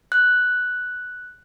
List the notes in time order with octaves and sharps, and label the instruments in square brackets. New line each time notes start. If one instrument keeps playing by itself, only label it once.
[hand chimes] F#6